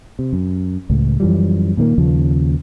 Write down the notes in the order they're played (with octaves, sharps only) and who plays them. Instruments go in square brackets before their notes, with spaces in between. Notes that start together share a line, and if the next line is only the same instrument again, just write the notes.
[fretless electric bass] C3
F#2
C#2 A2
F#2 E3 F3 G3
A#2 D#3 G3 A#3
D#2 C#3 F3